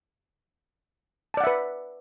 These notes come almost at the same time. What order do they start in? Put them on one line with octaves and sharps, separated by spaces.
A5 D5 F#5 E5 B4